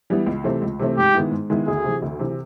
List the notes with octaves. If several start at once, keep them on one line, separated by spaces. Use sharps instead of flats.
E3 G3 B3 E4
C#2
C3 E3 A3 C4
C#2
C3 E3 A3 C4
G#2 G4
D#3 G#3 B3 E4
G#2
D#3 G#3 B3 E4
D2 G#4
C3 E3
D2
C3 E3